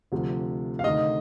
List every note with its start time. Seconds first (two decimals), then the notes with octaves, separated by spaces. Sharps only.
0.12 D2 C3 F3
0.79 F5
0.84 D2 C3 D#3 D#5